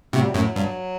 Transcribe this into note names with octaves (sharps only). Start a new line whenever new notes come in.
A2 C3 F#3
G3
F#2 A2 F#3
G2